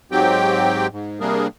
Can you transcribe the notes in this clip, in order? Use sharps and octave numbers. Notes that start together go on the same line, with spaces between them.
G#2 F#3 C4 G4 G5
G#2
C3 G3 A#3 D4 G#4 A#4